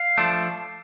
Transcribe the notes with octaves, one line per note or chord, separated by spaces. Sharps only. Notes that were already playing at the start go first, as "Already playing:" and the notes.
Already playing: F5
F3 A3 D4